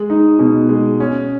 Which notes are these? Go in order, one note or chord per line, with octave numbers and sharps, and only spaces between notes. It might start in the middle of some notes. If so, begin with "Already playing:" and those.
Already playing: G#3
D#4
B2
G#3
C#4